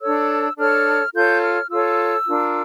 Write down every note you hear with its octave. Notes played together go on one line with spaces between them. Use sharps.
D4 A4 C#5 E6
D4 A4 C#5 F6
F4 A4 C#5 G6
F6
F4 A4 C#5 E6
D4 F4 A#4